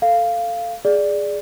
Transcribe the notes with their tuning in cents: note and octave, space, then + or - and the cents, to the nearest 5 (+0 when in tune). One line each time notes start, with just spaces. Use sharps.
A4 +10 F5 -10
G#4 +0 D5 +0